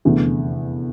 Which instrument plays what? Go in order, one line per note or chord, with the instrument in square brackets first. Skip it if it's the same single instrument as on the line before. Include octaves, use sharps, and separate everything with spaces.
[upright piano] F1 E2 D3